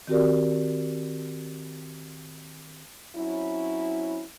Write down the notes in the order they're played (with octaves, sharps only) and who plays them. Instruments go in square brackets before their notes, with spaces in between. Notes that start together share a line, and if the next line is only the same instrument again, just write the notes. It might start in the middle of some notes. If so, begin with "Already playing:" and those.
[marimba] D#3 C4 F#4 G4 A#4 D5
[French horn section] F#3 C4 C#4 E4